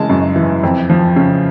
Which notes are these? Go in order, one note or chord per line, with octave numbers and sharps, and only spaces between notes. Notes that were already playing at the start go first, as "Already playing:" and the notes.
Already playing: C#3 E3 G#3 A5
F#2
E3
F2
F3
C#3